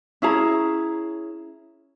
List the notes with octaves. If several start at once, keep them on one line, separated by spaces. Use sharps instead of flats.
C#4 E4 G#4 A#5